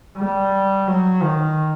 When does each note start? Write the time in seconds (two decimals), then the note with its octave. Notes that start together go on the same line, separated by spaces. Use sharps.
0.18 G3
0.88 F#3
1.23 D#3